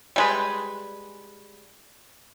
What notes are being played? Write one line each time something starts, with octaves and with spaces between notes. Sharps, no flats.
G3 G#3 B4